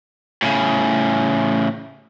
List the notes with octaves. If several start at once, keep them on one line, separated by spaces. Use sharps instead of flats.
A2 C#3